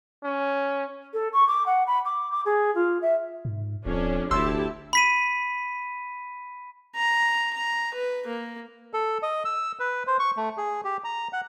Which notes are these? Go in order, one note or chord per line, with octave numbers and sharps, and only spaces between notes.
C#4
A4
C#6
D6
F#5
B5
D6
D6
G#4
F4
E5
G#2
D1 F2 C#4 D4
F1 D2 E4 G4 A5 C6 E6
B5 B6 D#7
A#5
A#5
B4
A#3
A4
D#5
E6
B4
C5
C#6
A3
G#4
G4
A#5
F#5